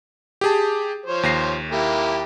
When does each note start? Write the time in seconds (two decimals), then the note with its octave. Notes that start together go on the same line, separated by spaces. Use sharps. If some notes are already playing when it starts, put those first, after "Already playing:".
0.41 G4 G#4 A5
1.06 F3 C5 C#5
1.23 D#2 A#6 C7
1.72 A#3 E4 G4